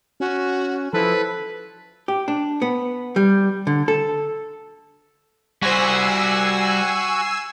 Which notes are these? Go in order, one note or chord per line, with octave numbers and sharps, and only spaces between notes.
C#4 F#4
F3 E4 A4 B4
G4
D4
B3
G3
D3
A4
G3 F#4 C5 G#5 E6 C7